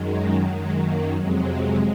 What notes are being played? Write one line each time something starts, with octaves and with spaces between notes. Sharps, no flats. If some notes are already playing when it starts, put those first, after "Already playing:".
Already playing: F#2 D#3 F#3 G#3
F#2 D#3 F#3 G#3
A#3
F2 C3 F#3 G#3